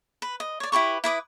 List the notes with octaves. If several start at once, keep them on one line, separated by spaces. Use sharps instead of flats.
B4
D#5
C#5 D5
E4 G4 B4 C#6
E4 B4 D6 D#6